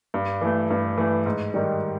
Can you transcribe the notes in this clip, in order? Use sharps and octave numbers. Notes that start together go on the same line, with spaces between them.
G2
E3 A3
G2
E3 A3
G#2
D#3 G3